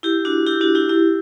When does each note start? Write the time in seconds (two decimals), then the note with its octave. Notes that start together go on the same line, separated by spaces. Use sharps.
0.03 E4 G4
0.25 D4 F#4
0.46 E4 G4
0.61 D4 F#4
0.75 E4 G4
0.89 E4 G4